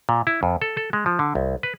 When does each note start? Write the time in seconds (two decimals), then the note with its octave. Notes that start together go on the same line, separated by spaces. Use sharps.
0.09 A#2
0.27 E4
0.43 F2
0.62 A4
0.77 A4
0.93 G#3
1.06 F3
1.19 D3
1.35 C2
1.63 B4